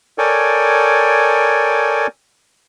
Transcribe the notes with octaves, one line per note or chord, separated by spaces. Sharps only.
A4 A#4 C#5 D5 G5 G#5